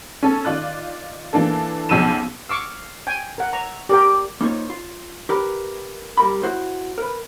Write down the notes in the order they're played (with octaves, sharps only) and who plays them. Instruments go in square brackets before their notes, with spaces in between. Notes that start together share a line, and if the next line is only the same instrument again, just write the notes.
[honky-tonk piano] C#4 A4
D#3 F4 D5 F#6
E3 A#3 D4 A4
B1 C#3 F3 E6 D#7 E7
[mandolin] F5 [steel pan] C#6 D6 E6
[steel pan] G5 G#5
A#4 F#5
[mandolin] C#5 E5 [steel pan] A#5
[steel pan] G4 A#4 G5 [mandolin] D5
[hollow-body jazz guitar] A#3 D#4 F4 C5 C#5
F4
G4 A#4 B4
G3 A#4 B5
E4 F#4 C5
A#4 B4